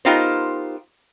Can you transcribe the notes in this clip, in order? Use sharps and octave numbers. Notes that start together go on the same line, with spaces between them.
B3 D#4 F4 G4 A#4 C5